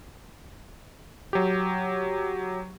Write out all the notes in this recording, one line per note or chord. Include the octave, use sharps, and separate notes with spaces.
F#3 G4